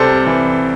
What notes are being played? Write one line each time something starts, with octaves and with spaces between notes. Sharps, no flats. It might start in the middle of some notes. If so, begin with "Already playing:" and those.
Already playing: C2 C3 G4 A4 C5 D5
E3